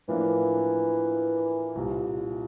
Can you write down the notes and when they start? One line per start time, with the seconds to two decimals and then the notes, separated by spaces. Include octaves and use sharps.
0.08 A2 E3 F3 A#3 D4
1.75 C2 A#2 G3